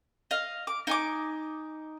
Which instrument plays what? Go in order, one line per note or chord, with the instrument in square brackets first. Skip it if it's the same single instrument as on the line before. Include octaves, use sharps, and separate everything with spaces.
[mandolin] D#5 F5
D6
D#4 G#5 D6